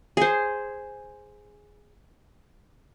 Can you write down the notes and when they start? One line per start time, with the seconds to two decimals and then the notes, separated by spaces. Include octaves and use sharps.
0.17 G#4 C5